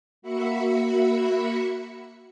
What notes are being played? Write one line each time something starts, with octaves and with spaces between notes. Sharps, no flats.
A#3 F#4 E5 B5 C#7